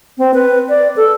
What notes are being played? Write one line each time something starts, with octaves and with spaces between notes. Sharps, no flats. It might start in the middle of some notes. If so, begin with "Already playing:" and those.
C4
B4
D5
A4